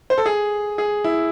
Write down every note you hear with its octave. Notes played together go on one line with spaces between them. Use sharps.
C5
A4
G#4
G#4
E4